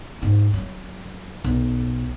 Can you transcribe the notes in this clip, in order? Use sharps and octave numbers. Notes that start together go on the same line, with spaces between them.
G#2 A#3
F#3
B1